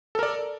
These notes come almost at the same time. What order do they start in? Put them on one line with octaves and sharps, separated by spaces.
A4 A#4 D5